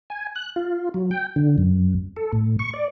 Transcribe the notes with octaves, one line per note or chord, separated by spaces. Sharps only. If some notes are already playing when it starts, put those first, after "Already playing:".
G#5
F#6
F4
F#3
G5
D3
F#2
A4
A2
C#6
D5